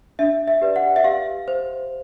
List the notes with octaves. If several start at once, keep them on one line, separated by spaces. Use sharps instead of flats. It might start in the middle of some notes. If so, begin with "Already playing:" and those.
D4 E5
E5
G4 B4 D5
F#5
E5
G4 F5
C5